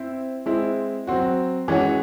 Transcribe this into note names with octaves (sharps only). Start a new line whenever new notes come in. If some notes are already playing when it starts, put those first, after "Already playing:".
Already playing: C4 E4 C5
G#3 C4 E4
F#3 C4 F#4
E3 G#3 C#4 F#4 C#5